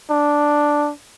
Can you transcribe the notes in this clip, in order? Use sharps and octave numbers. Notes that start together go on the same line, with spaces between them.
D4